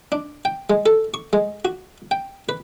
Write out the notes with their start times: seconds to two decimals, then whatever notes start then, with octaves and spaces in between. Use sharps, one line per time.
0.12 D4
0.45 G5
0.70 G#3
0.86 A4
1.14 C#6
1.33 G#3
1.65 F#4
2.11 G5
2.49 B4